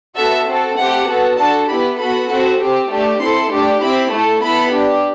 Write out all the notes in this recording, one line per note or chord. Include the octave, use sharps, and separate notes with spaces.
B3 F#4 A4 E5
C4 F#4 A4
A3 C4 G4 F#5
B3 F#4 A4
D4 F#4 A4 A5
B3 E4 G4 B5
B3 F#4 A4 B5
C4 F#4 A4
C4 G4
A3 D4 G4
C4 E4 A4 C6
A3 D4 G4
C4 E4 G4 B5
A3 E4 A4
B3 E4 A4 B5
D4 G4